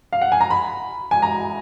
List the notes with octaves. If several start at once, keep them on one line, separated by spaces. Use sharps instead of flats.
F5
F#5
G#5
A#5
B5
G#5
A#5